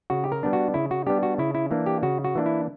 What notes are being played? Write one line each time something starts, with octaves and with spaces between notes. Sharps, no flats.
C#3 F#4
G4
A#4
G3 B3 D4
F#4
C#3 E4
F#4
G3 B3 D4 G4
F#4
C#3 E4
E4
E3 A#3 D4
G4
C#3 F#4
F#4
E3 A#3 D4
E4